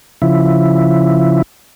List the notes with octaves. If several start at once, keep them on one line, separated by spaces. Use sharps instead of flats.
C#3 F3 E4